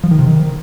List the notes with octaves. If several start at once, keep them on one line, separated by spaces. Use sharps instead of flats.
F3
D#3
C3
D#3